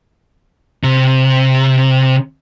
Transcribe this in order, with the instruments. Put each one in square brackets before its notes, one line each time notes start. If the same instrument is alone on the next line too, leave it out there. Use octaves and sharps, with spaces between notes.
[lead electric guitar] C3